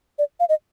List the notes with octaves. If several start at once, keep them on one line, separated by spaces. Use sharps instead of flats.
D5
F5
D#5